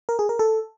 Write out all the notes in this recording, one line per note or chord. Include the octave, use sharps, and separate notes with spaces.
A#4
G#4
A#4
A4